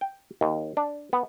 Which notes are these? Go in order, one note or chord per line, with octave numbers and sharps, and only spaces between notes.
G5
D#2
D4
B3